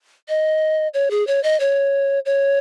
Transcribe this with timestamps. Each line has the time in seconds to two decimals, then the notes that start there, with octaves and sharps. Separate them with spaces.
0.29 D#5
0.94 C#5
1.11 G#4
1.27 C#5
1.43 D#5
1.60 C#5
2.26 C#5